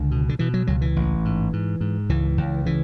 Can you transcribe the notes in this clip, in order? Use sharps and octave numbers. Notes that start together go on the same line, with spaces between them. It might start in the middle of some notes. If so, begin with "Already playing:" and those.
Already playing: C#2 D3
B2
D3
B2 E3
F#3
C#2 F#3
E3
A1
G#2
G#2
G#2
C#2 E3
C#2
C#3 E3